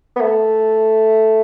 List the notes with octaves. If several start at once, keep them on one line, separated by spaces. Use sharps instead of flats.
B3
A3